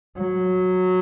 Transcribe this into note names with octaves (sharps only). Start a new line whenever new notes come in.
F#3